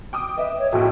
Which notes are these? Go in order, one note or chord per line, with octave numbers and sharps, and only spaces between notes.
G5 D6 D#6
B4 D#5 E5
C#5
A#1 F2 A2 F#4